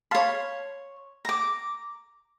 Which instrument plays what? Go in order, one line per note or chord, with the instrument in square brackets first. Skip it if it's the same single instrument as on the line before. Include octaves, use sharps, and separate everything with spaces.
[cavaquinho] C#5 C6 [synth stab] F5 A5 B5
[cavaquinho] A#5 D6